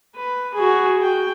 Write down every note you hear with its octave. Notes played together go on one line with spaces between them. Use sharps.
B4
F#4 G#4
G5